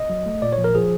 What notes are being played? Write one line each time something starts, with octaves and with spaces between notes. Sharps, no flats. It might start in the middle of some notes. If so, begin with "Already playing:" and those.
Already playing: D#5
F#3
A3
A#2 D5
C#5
F3
A#4
F3 G#4